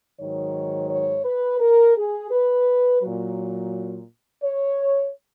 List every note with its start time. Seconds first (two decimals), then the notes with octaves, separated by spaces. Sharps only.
0.19 G#2 D#3 F#3 C#5
0.90 C#5
1.25 B4
1.60 A#4
1.97 G#4
2.31 B4
3.02 A#2 F#3
4.43 C#5